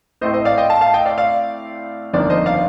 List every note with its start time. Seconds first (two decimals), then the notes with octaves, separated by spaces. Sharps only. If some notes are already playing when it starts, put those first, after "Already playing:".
0.21 A2 A3 C4 C5 D#5
0.34 C5 D#5
0.45 D5 F5
0.57 D#5 G5
0.70 F5 A5
0.81 F5 A5
0.94 D#5 G5
1.06 D5 F5
1.18 D5 F5
2.13 G1 F2 D#3 A#3 D4 D5
2.30 C5 D#5
2.46 D5 F5